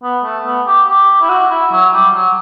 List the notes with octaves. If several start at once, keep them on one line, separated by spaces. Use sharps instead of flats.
B3
A3
B3
G4
G4
E4
F#4
E4
F#3
G3
F#3